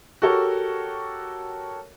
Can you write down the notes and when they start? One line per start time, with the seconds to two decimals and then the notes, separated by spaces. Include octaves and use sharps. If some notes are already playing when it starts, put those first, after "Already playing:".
0.22 F#4 G4 A4 A#4 C#5